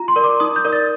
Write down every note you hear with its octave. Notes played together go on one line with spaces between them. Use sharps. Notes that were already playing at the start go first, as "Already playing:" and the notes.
Already playing: F4 A#5
C6
A#4 D5
D6
D#4 D#6
G6
A#4 D5
A6